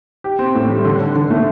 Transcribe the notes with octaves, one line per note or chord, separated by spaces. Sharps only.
G4
C4
A2
G3
D3
D3
D3
A3